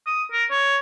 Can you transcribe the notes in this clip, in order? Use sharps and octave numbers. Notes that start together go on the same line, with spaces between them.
D#6
A#4
C#5